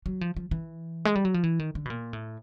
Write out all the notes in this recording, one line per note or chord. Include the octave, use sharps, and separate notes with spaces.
F#3
F3
F3
E3
G#3
G3
F#3
F3
E3
D#3
D3
B2
A#2
A2